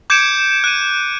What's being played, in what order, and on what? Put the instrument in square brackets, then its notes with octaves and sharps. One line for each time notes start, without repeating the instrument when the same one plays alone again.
[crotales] D6 G6 G#6 C#7 D7 E7
F#6 D#7